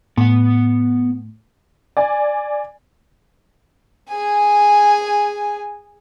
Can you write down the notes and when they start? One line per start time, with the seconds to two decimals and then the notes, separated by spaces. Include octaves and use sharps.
0.17 A2 B3 F#5
1.97 D5 G#5
4.09 G#4 G#5